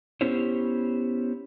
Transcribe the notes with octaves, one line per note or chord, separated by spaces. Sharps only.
B3 C#4 E4 G4 C5 C#5